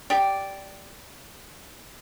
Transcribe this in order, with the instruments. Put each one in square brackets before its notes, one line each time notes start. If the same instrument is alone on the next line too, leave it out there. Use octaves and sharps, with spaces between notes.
[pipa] G4 D5